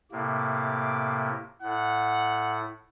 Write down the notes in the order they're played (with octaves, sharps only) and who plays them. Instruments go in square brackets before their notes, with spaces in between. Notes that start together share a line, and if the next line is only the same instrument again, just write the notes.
[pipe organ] A2 C3 A#3 [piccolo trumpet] D6
[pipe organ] A2 [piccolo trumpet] F#5